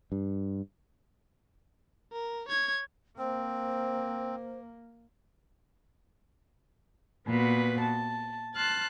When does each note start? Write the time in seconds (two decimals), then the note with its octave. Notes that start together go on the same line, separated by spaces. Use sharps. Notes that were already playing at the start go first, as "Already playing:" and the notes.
0.12 G2
2.13 A#4
2.48 C#5 G#6
3.18 A#3 C4 C5
7.27 A#2 B3 F#4 B4
7.81 A5
8.55 A5 C6 F6 F#6 A6